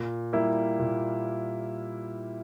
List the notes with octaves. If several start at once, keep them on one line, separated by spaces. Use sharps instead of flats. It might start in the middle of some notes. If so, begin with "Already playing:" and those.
Already playing: A#2
G3 A#3 E4
A#2